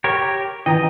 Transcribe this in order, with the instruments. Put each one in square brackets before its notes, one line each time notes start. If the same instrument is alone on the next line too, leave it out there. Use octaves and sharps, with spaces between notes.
[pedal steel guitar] G4 A#4 C#5
[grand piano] E3 [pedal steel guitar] D#5 [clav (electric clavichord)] G5 A#5